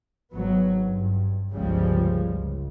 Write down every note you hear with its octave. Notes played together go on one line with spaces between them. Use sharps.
G#1 F#3 B3
G2
G1 C#2 C#3 F3 G3 G#3
C#2